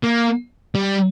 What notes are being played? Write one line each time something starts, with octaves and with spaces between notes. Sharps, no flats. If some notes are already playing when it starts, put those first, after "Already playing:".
A#3
G3